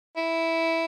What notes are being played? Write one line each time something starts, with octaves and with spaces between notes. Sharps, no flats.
E4